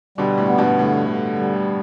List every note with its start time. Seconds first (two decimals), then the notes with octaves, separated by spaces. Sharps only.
0.18 B2 D3 G3
0.38 A2
0.48 B3
0.58 G2 B2
0.79 A2 D3
1.09 D3
1.39 G3